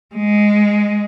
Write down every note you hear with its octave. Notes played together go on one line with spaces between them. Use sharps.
G#3